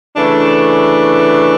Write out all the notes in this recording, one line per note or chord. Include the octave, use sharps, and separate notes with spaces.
C#3 E3 A3 D4